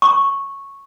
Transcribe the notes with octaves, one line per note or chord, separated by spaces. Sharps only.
C#6